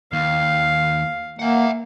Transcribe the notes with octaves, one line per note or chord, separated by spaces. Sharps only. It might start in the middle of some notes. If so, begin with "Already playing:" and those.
D#2 F5
A#3 E5 F#5